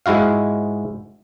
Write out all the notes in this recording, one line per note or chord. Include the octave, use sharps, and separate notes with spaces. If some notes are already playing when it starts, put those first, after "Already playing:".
G#2 G#3 E4 F#4 F5